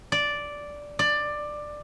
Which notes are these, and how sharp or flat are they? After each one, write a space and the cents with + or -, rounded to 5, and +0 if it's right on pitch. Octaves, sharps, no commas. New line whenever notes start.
D5 -5
D5 +15